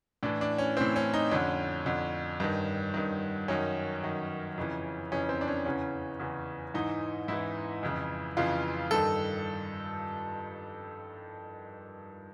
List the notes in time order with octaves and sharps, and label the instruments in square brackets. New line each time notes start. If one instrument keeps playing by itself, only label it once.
[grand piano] A2 E3 D4
D4
C#4
A2 E3 C4
C#4
D#4
F2 D3 C#4
F2 D3
G2 D#3
G2 D#3
F#2 D#3 C#4
F#2 D#3
F2 C#3 E3
F2 C#3 E3 C#4
C4
D4
C#4
E2 C#3 E3 C#4
E2 C#3 E3
G#2 E3 D#4
G#2 E3 E4
F2 C#3 E3
F2 C#3 E3 F4
G2 D#3 A4